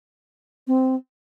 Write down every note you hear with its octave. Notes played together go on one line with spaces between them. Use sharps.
C4